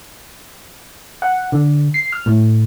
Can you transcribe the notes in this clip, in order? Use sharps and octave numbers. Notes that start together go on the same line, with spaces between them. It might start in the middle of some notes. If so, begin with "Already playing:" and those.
F#5
D3
C7
F6
A2